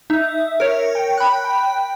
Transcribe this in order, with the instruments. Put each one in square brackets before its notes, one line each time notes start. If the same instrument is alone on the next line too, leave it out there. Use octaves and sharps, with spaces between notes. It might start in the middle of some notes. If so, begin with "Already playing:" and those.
[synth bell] D#4 [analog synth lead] E5
[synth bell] A#4 C#5
[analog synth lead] G5
[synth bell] B5 F#6
[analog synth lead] G5